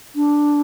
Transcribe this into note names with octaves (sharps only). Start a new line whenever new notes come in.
D4